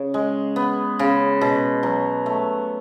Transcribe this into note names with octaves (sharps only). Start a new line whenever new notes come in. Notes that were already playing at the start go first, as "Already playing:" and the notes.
Already playing: C#3
G#3
B3
C#3
B2
F#3
A3